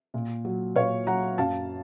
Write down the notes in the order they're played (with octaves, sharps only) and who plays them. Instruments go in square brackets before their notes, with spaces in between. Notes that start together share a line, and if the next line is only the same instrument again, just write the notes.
[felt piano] A#2
F#3
A#2 C#5 F5
F#3 F#5 A#5
F#2 F5 A5